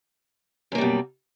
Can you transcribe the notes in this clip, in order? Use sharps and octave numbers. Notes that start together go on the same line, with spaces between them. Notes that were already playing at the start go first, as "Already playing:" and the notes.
F#2 B2 G3 A#3